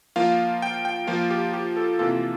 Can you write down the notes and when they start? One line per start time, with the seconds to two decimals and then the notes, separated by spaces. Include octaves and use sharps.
0.16 F3 A#3 F4 F5
0.62 G5
0.85 G5
1.07 F3 A#3 F4 F5
1.31 G4
1.53 G4
1.77 A4
1.99 C3 E3 A#3 F4 A4